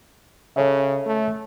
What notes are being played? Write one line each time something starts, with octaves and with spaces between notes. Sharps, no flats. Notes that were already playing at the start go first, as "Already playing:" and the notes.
C#3 A4 C#5 E5
A3